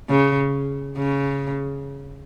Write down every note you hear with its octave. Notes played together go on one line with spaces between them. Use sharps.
C#3
C#3